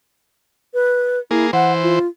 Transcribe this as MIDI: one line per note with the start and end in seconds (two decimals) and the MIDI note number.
0.74 1.20 71
1.31 1.51 58
1.31 1.47 64
1.31 1.51 68
1.53 1.99 52
1.53 1.99 72
1.53 1.73 78
1.83 2.07 65